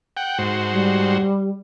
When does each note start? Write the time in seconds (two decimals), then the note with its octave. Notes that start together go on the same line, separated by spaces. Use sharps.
0.17 F#5 G5
0.38 G#2 F#4 C5
0.72 G3